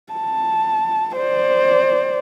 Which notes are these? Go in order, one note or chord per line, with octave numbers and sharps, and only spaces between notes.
A5
C5 D5